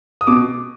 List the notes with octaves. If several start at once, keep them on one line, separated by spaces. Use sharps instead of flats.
D#6
B2 D6